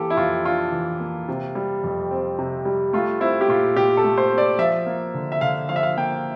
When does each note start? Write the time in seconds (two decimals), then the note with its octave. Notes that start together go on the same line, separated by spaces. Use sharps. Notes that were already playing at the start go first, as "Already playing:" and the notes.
Already playing: E3 A#3 G4 A4
0.10 E4
0.17 F2 F4
0.45 D4 F4
0.72 E3
1.00 A#3
1.28 C3
1.55 G3
1.84 F2
2.11 C4
2.38 C3
2.65 G3
2.93 A3 F4
3.20 C4 E4
3.41 G4
3.48 A#2 F4
3.76 A#2 G4
3.97 A4
4.04 A3
4.18 C5
4.31 C4
4.38 D5
4.58 F3 E5
4.86 A#3
5.14 D3
5.32 E5
5.41 D3 F5
5.69 F3 F5
5.76 E5
5.83 F5
5.97 A#3 G5